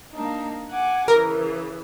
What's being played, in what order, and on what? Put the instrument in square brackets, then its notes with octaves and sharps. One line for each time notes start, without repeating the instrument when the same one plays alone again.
[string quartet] A#3 D4 D#4
F#5 G#5 D6
[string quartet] C#3 E3 [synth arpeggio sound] A#4